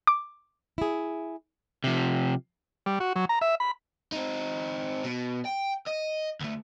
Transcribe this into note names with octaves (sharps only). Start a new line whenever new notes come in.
D6
E4 G#4
C3 F3
G3
F#4
F#3
A#5
E5
B5
C4 D#4
B2
G5
D#5
D2 A3